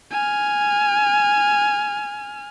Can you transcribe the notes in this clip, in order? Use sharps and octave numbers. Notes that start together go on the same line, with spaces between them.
G#5 F6